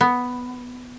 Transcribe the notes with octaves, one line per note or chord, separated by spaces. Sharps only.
B3